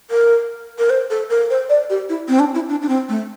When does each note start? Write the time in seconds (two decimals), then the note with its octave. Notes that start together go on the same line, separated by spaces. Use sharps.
0.11 A#4
0.79 A#4
0.90 C5
1.10 A4
1.30 A#4
1.50 C5
1.69 D5
1.90 G4
2.09 E4
2.29 C4
2.39 D4
2.55 E4
2.69 D4
2.82 D4
2.89 C4
3.09 A3